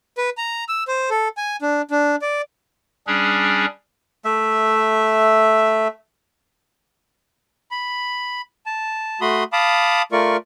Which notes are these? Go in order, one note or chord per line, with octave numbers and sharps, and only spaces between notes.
B4
A#5
E6
C5
A4
G#5
D4
D4
D5
G3 C#4 D4 G#4
A3 E5
B5
A5
A3 F#4 B5 C6 D#6
F5 A5 B5 D6 D#6
A3 F4 A#4 D5 C#6